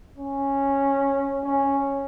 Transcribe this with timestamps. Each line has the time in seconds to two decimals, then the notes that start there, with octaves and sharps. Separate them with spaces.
0.18 C#4
1.44 C#4